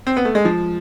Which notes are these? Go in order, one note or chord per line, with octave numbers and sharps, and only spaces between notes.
C4
B3
A3
G#3
F3